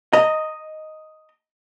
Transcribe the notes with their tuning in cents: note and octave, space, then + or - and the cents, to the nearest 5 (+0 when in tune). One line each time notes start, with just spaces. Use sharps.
D#5 +0 A#5 -20